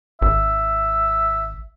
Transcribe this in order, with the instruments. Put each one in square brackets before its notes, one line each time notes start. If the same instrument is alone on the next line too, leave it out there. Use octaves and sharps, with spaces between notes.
[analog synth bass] G#1 [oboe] E5